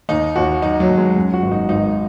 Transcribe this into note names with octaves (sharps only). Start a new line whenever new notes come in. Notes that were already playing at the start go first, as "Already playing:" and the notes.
D#2 D#4
D#2 F#4
F#3 D#4
F#3
D#2
G#3
F#2
F#4
G#1
D#4
G#1 D#4